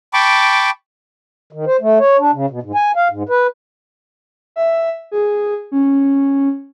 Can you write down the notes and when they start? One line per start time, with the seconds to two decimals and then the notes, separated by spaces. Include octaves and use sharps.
0.13 G5 A5 B5 C#6 D6
1.53 D#3
1.66 C5
1.81 A3
2.00 C#5
2.19 D4
2.33 C#3
2.50 B2
2.62 G#2
2.75 G#5
2.96 F5
3.10 G#2
3.29 B4
4.56 E5
5.12 G#4
5.72 C#4